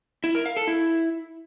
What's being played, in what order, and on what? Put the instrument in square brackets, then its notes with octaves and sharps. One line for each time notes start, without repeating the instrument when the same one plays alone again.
[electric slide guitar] E4
A#4
F5
A4
E4